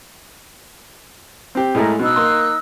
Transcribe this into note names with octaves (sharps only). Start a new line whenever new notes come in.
C4 G4
A2 G#3 A3 A#4 B5
B2 D#4 E6 F#6
A#3 C6